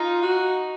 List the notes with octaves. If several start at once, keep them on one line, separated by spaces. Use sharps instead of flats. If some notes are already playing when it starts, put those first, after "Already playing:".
Already playing: D#4 F4
F#4